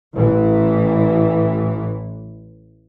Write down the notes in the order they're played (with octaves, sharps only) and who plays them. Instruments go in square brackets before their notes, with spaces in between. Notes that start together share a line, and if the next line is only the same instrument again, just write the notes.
[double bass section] A1 E3